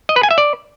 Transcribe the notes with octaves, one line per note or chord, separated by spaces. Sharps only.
D#5
B4
G#5
E5
D5